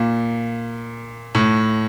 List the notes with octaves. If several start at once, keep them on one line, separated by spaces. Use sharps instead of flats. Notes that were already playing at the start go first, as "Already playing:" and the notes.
Already playing: A#2
A2